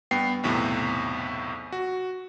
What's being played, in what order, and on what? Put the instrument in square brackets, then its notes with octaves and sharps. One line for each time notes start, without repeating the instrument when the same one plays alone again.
[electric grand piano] G2 B3 G5 C7
B1 E2 A2 C3
F#4